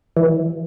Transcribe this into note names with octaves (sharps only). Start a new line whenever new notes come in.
E3